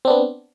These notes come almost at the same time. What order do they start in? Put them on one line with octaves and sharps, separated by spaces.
C4 D4 B3